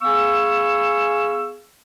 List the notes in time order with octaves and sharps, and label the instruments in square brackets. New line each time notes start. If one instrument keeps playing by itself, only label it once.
[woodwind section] B3 G#4 F5 G#5 C#6 E6